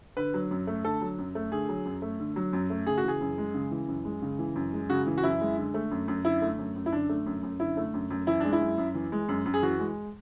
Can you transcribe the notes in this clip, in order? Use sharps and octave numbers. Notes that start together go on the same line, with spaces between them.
D3 B4
F#3
F#2
A3
D3 A4
F#3
F#2
A3
D3 G#4
F#3
F#2
A3
D3
F#3
F#2
A3
C#3 G#4
F#4
E3 G#4
F#2
G#3
C#3
E3
F#2
G#3
C#3
E3
F#2
G#3
C#3 F#4
E3
F#4
F#2 E4
G#3
D3
A3
F#2
F#2
D3 E4
A3
F#2
F#2
E4
D3 D4
A3
F#2
F#2
D3 E4
A3
F#2
F#2
E3 E4
G#3 D4
E4
F#2
F#2
E3
G#3
F#2
F#2
G#4
E3 F#4
G#3